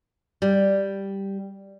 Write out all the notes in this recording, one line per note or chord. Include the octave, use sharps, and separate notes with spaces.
G3